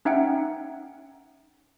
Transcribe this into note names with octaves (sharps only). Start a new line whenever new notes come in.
C#4 D#4 E5 F#5 G5